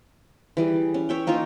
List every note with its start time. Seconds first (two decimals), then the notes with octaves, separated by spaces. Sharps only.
0.57 E3 G3 G#4
0.94 C#4
1.09 C#5 E5 G5
1.27 A#3 D#4 F4 C#5